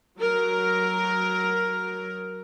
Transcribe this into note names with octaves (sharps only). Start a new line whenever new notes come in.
F#3 A#4